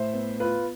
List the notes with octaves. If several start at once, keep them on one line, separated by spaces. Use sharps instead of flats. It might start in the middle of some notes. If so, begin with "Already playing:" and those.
Already playing: A2 C5 E5
B3
F4 B4